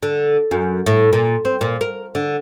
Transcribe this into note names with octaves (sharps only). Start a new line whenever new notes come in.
D3
F#2
A2
A#2
C4
A#2
A#4
D3